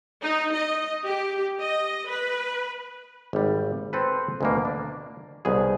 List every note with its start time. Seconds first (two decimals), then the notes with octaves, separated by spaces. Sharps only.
0.22 D#4
0.53 D#5
1.04 G4
1.60 D#5
2.09 B4
3.33 G#1 G3
3.93 C4 A4 B4
4.41 D2 B2 A#3
4.65 D4
5.45 C2 B2 G#4